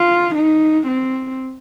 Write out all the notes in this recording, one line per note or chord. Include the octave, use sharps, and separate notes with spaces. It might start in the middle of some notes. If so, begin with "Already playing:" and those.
Already playing: F4
D#4
C4